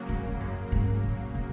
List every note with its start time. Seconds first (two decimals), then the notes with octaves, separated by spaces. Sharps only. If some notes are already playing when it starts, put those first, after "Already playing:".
Already playing: C#3 F#3 A#3
0.09 G#2
0.29 G#2
0.40 F#2
0.72 G#2
1.03 A#2
1.35 B2